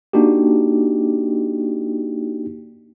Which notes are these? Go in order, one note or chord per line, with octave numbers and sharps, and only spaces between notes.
A#3 D4 D#4 F#4 G4